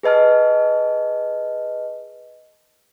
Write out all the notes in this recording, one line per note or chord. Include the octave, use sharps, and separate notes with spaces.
G#4 B4 D#5 A5 F6